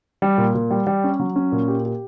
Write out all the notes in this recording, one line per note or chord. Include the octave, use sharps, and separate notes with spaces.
G3
A#2
A#2
G3
G3
C#4
F#3
C#4
A#2
G4
G4